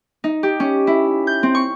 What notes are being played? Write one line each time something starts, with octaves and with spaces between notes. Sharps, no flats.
D#4
G4
C#4
E4
G6
C4
C#6